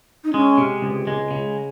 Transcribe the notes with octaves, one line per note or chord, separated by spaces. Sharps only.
D#4
G#3 C#4
C3
C#2
G#3
C#3